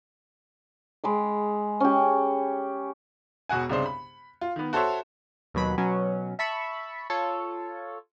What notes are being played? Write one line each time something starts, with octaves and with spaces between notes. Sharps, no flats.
G#3 B5 D6
C#4 G4
E1 B2 F#4 F#5 G#5
C2 C#3 D4 C5
B5
F4
D#3 B3
F#4 A4 C5 C#5 E5
D#2 B2 F#3 B5
B2 F#3 C#4
E5 A5 B5 C#6 E6
F4 A4 C#5